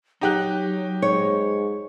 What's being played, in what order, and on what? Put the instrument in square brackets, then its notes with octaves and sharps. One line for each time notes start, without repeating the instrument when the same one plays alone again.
[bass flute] F#3 [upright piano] D#4 G4 F#6
[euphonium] G#2 [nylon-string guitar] C#5